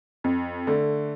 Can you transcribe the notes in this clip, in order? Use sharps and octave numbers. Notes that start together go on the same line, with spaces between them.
F2
D3 A3